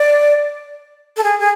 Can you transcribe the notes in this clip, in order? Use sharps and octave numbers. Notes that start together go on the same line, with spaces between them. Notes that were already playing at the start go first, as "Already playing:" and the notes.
Already playing: D5
A4
G#4
G#4